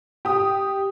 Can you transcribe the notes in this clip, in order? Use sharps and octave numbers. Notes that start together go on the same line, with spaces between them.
G4 D#6